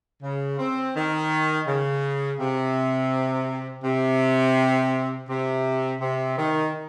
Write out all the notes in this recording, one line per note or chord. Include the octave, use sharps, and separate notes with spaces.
C#3
C4
D#3
C#3
C3
C3
C3
C3
D#3